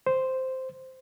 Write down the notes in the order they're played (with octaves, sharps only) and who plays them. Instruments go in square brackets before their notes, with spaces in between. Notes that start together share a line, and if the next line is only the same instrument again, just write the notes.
[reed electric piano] C5